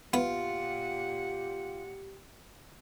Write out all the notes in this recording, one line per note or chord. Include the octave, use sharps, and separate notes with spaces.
A#2 B3 F4 G4 F#5